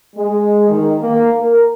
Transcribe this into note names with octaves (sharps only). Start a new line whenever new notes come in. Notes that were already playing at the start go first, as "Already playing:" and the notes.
G#3
D#3
A#3
A#4